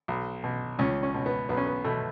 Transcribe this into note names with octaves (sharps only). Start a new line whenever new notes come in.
B1
B2
C#2 C#4
C#4
B2
B3
B1 B3
C#4
B3
B2 A3